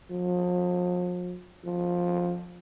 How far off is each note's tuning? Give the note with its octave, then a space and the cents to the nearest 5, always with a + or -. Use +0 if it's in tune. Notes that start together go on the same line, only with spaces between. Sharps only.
F3 +40
F3 +15